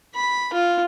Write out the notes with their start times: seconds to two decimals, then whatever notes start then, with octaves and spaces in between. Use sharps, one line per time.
0.14 B5
0.53 F4